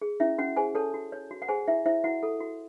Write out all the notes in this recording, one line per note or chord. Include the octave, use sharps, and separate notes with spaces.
G#4
C#4 E4 E5
C#4 F#4 F#5
G#4 C5 G#5
A4 C#5 A5
F#4
C#5
F#4
F#5
G#4 C5 G#5
E4 E5
E4 C5 E5
E4 F#4 F#5
A4
F#4